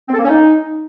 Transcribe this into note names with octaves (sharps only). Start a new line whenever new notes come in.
C4
A4
A#3
C#4
D#4